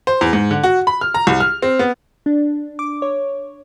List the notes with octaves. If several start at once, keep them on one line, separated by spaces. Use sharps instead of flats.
C5
E2
G#2
D3
F#4
B5
F6
A#5
C2
F6
C4
B3
D4
D6
C#5